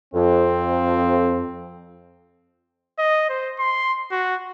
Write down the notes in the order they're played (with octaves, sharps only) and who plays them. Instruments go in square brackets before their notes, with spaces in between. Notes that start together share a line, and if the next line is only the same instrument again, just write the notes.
[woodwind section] F2 [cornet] C4
[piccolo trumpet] D#5
C5
C6
F#4